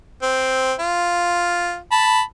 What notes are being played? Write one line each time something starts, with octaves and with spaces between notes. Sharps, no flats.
C4
F4
A5 B5